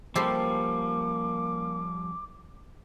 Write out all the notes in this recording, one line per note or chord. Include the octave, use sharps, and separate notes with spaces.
F3 G3 A#3 C#4 G4 A4 C5 D6